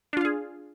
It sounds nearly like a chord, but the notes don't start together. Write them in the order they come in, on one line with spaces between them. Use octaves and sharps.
D4 F4 F5 G#4